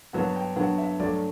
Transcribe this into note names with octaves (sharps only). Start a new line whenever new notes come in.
G2 F#3 B3 D4 F#5
G5
G2 F#3 B3 D4 F#5
E5
G2 F#3 A3 D5